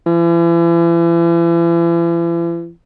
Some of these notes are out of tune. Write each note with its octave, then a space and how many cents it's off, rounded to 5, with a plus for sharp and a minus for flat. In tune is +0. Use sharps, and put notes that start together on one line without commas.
E3 +40